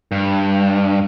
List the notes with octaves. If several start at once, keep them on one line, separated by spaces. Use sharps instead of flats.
G2